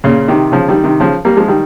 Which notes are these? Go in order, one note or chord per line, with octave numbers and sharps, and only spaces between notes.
A#2 C#3
C3 D#3
C#3 F3
D#3 G3
C3 D#3
C#3 F3
G3 A#3
F3 G#3
D#3 G3